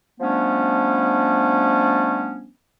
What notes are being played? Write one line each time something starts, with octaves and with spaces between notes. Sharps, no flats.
F3 G3 A3 B3 C#4 D4